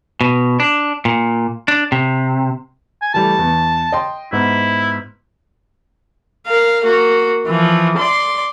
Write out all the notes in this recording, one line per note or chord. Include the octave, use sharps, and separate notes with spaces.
B2
D4
A#2
D4
C3
G#5
E3 G3 A3 A5
E2
D#5 G5 C6
G#2 B3 E4
A#4 F5
A#3 F#4
E3 F3
D5 C6